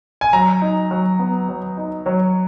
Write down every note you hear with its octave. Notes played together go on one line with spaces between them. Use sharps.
G#5
F#3 A#5
D#4
F#3
B3
F#3
D#4
F#3 C#5